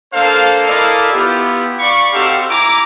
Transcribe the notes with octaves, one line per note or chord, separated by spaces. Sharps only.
A#3 D4 A4 C5 F5
E4 A4 A#4 D5 D#5 F5
B3 E4 F4 G4
D5 F5 B5 C#6
C4 D#4 F#4 G4 A4 F5
E4 G#5 A#5 D6